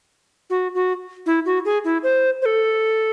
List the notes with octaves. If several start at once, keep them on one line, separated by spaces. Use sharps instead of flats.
F#4
F#4
E4
F#4
G#4
E4
C5
C5
A4